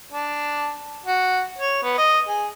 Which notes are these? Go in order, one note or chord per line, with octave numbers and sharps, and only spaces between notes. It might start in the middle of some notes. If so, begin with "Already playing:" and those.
D4
F#4
C#5
B3
D#5
G#4